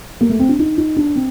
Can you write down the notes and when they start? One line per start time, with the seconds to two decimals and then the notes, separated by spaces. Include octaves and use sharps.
0.21 A#3
0.29 A3
0.39 C4
0.49 D4
0.59 D#4
0.78 D#4
0.97 D4
1.16 C4